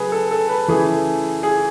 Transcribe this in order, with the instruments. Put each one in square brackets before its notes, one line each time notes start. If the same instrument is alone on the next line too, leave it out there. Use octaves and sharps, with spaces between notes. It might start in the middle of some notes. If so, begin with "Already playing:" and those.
Already playing: [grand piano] C#3 F#3 A3 G#4 B4
A4
A4
B4
C#3 E3 A3 G#4
G#4